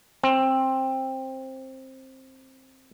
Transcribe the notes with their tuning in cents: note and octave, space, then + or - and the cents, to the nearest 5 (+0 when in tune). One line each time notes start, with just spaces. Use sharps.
C4 +15